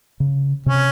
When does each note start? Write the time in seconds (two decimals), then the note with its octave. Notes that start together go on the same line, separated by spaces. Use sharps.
0.20 C#3
0.66 C3 C#4